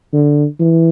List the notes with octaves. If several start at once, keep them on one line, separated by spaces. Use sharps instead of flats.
D3
E3